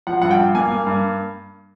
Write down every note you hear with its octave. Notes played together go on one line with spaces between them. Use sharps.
F3 F#5
G2 F#5
G5
G2
A#3 G#5
A#3
G2